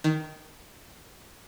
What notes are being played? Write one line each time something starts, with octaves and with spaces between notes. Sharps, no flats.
D#3